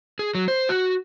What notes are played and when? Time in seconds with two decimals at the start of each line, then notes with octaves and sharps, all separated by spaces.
0.19 G#4
0.35 F#3
0.48 C5
0.69 F#4